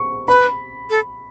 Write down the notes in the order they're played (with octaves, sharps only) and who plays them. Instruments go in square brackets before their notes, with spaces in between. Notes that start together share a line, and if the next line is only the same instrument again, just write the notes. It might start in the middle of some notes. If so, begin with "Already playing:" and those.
Already playing: [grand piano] C#6
[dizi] B4 [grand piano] B5
[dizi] A4